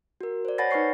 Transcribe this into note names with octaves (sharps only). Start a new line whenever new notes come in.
F#4 A#4
C5 D5
C#5 F#5 G#5 B5 A6 A#6
D#4 B4 G#5 C#6 C7